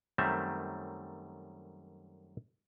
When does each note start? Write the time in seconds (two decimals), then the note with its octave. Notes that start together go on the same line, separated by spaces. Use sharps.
0.18 F#2 D#3 G3 A3 C4 E5